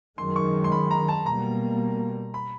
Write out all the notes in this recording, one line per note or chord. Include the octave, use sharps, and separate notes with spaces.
F#2 D#3 G#3 C6
C#6
C6
B5
A#5
A5
B2 G3 A#3 A#5
B5